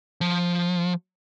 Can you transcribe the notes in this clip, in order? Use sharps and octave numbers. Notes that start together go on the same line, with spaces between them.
F3